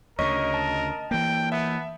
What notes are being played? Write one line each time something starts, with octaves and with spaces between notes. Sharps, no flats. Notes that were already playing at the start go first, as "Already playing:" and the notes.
D2 C#3 A#4 C#5 D#5 C#6 B6
A5
E3 A#3 G5
B3 E5